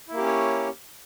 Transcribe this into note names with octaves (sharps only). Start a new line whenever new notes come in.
A#3 C#4 E4 G4 C#5